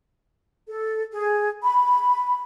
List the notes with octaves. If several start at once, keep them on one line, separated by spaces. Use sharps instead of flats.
A4
G#4
B5